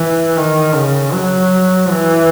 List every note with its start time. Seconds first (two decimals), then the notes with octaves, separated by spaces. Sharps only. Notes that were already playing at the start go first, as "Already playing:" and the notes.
Already playing: E3
0.37 D#3
0.75 C#3
1.13 F#3
1.89 E3